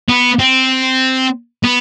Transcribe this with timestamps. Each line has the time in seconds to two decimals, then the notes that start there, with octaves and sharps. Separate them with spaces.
0.09 B3
0.39 C4
1.64 B3